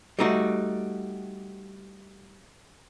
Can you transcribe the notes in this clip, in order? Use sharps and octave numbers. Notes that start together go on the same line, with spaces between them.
G3 A3 D#4 F#4